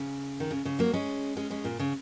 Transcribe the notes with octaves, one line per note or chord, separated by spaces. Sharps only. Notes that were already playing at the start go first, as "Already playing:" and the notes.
Already playing: C#3
D#3
C#3
C#3
F#3 A#3
G#3 C#4
G#3 C#4
G#3 C#4
A#2
C#3